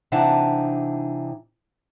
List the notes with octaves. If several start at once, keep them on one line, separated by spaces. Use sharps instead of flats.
C3 E3 D4 D#4 F#5 A5